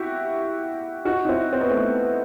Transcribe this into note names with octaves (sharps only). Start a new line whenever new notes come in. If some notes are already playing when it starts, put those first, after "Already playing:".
Already playing: E4 F#4 G4
D#4 F#4
D#4
C4 E4
C4
B3
A3 C4